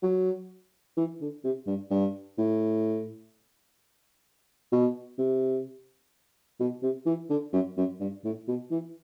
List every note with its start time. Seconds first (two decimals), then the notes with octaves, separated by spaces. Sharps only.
0.02 F#3
0.97 E3
1.21 D3
1.44 C3
1.67 G2
1.91 G2
2.38 A2
4.72 B2
5.18 C3
6.60 B2
6.83 C3
7.06 E3
7.30 D3
7.53 F#2
7.77 F#2
8.00 G2
8.24 A2
8.48 B2
8.71 E3